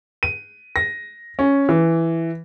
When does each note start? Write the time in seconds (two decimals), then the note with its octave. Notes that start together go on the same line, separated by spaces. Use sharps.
0.23 D#7
0.76 A#6
1.39 C#4
1.69 E3